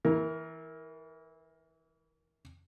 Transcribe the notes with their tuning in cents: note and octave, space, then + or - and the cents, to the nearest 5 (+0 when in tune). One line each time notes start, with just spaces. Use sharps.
E3 -25 A#4 +10